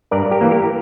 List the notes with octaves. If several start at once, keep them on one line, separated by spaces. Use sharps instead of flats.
G2 A#4 D5
G4 A#4
E3 A#3
G4 A#4